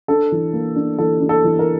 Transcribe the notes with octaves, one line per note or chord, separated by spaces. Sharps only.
D4 A4
E3
A#3
D4
E3 A4
D4
A4
E3
A#4